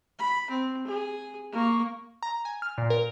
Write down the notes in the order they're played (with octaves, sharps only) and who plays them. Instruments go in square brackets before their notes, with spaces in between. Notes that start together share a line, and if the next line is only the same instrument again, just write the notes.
[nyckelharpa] B5
C4
G#4
A#3 C#6
[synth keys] A#5
G#5
F6
A#2
A#4